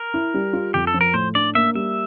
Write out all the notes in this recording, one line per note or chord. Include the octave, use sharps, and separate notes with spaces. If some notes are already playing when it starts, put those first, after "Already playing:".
Already playing: A#4
E4
G3
F4
F2 G4
A4
F3
A#4
A2 C5
D4 D5
A#3 E5
G3 E5